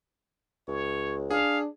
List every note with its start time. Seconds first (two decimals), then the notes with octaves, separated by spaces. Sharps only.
0.68 C#2 C#5
1.30 D4 G#4 F5